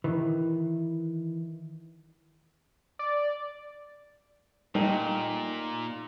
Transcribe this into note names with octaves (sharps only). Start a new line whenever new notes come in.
D#3 E3
D5
A#2 G3 A3 A#3 D#4 G4 D#5